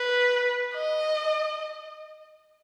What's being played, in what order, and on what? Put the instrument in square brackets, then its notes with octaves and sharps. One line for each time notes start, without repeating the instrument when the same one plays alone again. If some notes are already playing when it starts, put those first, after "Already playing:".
Already playing: [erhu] B4
D#5